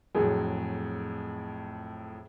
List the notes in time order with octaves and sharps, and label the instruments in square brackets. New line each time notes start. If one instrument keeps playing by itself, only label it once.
[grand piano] F2 A2 F#3 [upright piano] G#4